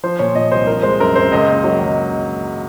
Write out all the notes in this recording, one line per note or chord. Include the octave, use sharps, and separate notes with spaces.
F3 C5
A#2 C#5
A#2 D#5
C2 C5
F3 A#4
G#3 C5
F#2 A#4
F#2 C5
C#2 D#5
A#3
F#3
C#2